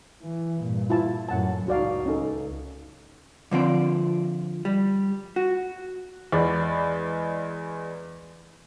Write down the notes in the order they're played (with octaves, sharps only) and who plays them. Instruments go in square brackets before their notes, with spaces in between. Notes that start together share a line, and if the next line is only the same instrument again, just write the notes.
[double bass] E3
G2 A#2
[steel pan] E4 F4 A5
[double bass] F#2 A2 [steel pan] F#5 A5
[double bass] C#2 D#4 [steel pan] F#4 D5 F5
[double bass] C#2 [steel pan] C#4 D#4 A4
[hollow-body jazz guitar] D3 F3 C4 D5
G3
F#4
[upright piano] E2 G#3 D5 B5